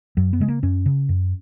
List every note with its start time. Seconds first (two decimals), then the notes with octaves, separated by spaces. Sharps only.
0.17 F#2 F#3
0.33 B3
0.40 C#3 G#3
0.48 A#3
0.63 F#2 C#4
0.86 C#3
1.09 F#2